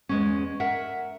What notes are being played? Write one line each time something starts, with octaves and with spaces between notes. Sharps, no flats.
E2 G#3 C#4
A#4 E5 F#5